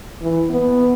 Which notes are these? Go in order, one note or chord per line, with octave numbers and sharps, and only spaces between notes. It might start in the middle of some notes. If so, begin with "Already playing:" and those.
E3
B3